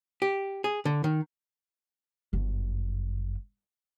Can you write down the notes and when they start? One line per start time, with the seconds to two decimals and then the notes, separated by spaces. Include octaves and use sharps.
0.22 G4
0.64 G#4
0.85 D3
1.04 D#3
2.33 G1 F#2